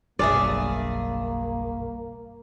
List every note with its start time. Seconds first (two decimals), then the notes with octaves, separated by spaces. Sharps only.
0.19 F#1 B1 G2 A#3 G#4 D5 E5